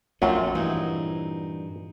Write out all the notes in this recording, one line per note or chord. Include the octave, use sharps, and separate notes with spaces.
A#1 F#2 A#2 A3 C4 F4 F#4
G2 E3 D#4